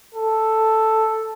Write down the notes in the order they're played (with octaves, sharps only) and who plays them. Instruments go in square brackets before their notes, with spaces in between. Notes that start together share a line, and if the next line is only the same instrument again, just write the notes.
[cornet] A4